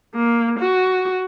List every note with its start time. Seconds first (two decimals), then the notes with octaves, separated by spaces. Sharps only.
0.15 A#3
0.60 F#4